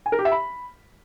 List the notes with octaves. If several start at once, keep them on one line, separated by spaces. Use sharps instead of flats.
G#5
A#4
G4
E5
B5